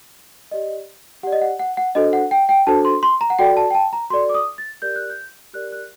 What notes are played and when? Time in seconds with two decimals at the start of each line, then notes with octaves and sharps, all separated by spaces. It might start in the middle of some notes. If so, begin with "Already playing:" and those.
0.51 G4 D5 D#5
1.23 G4 F#5
1.27 D5
1.33 D#5
1.41 F#5
1.59 F#5
1.77 F#5
1.95 D4 F#4 A4 C5 D#5
2.13 F#5
2.31 G5
2.49 G5
2.67 D4 F#4 A4 C5 A5
2.85 C6
3.03 C6
3.21 A#5
3.30 F#5
3.39 F#4 A4 D5 G5
3.57 A5
3.71 G5
3.75 A5
3.93 A#5
4.10 F#4 A4 D5 C6
4.29 D6
4.34 D#6
4.58 A6
4.82 G4 A#4 D5 G6
4.96 F#6
5.10 G6
5.54 G4 A#4 D5 F#6
5.72 F#6